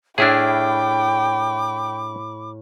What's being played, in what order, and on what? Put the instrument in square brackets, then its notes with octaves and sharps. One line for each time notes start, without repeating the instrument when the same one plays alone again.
[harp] A2 F6 [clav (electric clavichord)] D4 E4 G#4 [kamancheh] G5 [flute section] B5 D6